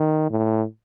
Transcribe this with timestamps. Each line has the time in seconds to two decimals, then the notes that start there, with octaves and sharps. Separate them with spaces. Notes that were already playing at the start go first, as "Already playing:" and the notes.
Already playing: D#3
0.30 A2